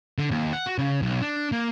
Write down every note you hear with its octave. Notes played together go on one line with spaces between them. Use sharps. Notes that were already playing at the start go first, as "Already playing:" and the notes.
D3
D#2
F#5
F#4
C#3
B1
D4
A#3